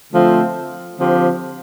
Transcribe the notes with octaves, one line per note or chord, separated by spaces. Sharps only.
D3 F3 A3 C4
D3 F3 C4 G4